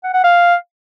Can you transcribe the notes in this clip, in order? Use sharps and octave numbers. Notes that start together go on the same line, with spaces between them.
F#5
F#5
F5